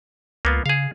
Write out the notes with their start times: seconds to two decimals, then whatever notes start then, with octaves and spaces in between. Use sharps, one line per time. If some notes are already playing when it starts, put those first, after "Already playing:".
0.45 C#2 A#3 B3 F4
0.66 C#3 G#4 F5